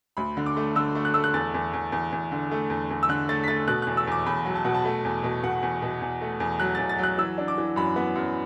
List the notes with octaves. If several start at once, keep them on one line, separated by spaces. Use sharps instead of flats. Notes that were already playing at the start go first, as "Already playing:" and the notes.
D2 B5
D3
D6
A3
D3 E6
A3
F#6
A3 E6
F#6
E2 A6
E2
E2
E2
E2
D3
A3
E2
E2
E6
D3 F#6
A3 A6
B6
A3 A6
B2 F#6
E2 F#6
E6
E2 D6
E2 B5
F#3
A5
B2 F#5
A5
A3
E2
B2
B2 F#5
E2
B2
E2
A3
E2
F#3 F#6
E2 A6
A6
F#3
F#6
E3 E6
D4
D6
E3
F#2 B5
B3
F#2